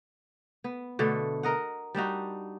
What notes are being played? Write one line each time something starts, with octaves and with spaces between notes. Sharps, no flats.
B3
B2 D3 A3
A#4 D#5 F#5
G3 D4 D#4 F#4